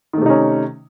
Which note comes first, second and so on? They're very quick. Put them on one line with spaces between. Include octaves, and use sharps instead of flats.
D#3 A3 C3 D#4 C#4